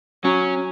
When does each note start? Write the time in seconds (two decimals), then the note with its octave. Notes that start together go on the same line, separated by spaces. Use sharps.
0.24 F#3 C#4